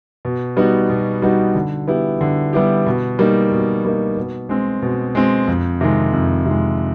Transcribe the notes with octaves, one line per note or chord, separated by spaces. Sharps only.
B2
G3 B3 D#4 F#4
B2
G3 B3 D#4 F#4
D3
G3 B3 E4 G4
D3
G3 B3 E4 G4
B2
G3 A#3 D#4
B2
G3 A#3 D#4
B2
G#3 C4
B2
G#3 C4
F2
C3 D#3 G#3
F2
C3 D#3 G#3